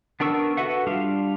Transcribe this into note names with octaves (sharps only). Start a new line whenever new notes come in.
B3 D4 A#4 C#6 E6
F#4 A4 B4 E5 F#5
G3 D4 F4 F5